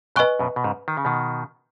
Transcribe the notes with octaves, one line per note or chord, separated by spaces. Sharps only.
F#2 B2 B4 D#5 G#5 C#6 F#6
F#2 B2
B2
G#2 C#3
D#3
C#3
B2 D#3